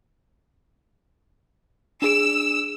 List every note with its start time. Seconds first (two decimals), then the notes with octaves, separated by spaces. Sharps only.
2.02 D4 G#4 E6 D7